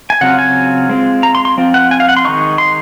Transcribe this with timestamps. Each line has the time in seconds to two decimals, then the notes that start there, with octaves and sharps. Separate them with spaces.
0.10 G#5
0.21 C#3 F#3 C4 F4 F#5
0.39 G#5
0.89 G#3 C4 F4
1.23 A#5
1.35 C6
1.45 C6
1.58 F3 C4 F4
1.74 F#5
1.91 G#5
2.00 F5
2.09 F#5
2.17 C6
2.25 D#3 G#3 D#4 C#6
2.58 C6